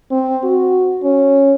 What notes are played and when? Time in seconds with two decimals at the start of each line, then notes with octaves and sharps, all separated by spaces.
0.11 C4
0.44 F#4
1.03 C#4